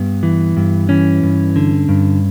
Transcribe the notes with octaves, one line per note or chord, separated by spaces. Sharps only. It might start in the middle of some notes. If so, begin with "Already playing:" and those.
Already playing: G2 B3
E3
G2
E3 C#4
G2
D3
G2